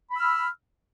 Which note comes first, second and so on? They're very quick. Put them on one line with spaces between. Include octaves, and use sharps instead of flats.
B5 E6 F6